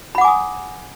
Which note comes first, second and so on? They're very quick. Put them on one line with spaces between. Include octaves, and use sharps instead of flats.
B5 F#5 D6 G#5 D#6